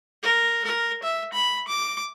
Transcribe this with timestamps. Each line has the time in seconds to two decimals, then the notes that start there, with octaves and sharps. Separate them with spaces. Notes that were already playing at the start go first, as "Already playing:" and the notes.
0.23 A#4
0.64 A#4
1.03 E5
1.33 B5
1.68 D6